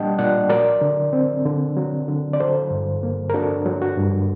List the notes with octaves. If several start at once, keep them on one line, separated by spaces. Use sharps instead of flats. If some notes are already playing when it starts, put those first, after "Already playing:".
Already playing: A#2 G3 A#3 D4 D#5 F#5 G5 A5
A#2 D5 F#5
F#3 A#4 D5
D3
C4
D3
F#3
D3
D5
F#3 A4 C5
G2
A#3
A#4
D4 F#4 A4
F#3
F#4
G2